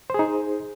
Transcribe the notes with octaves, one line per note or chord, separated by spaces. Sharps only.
D#4 G#4 C5